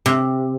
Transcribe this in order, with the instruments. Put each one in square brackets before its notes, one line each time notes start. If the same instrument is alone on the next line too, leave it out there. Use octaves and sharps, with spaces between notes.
[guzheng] C3